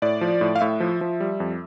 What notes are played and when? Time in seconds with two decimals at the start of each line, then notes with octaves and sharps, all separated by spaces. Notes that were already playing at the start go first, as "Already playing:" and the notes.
0.02 A2 D5
0.21 F3
0.41 A2
0.56 F5
0.61 A2 E5
0.80 F3
1.01 F3
1.20 G3
1.40 F2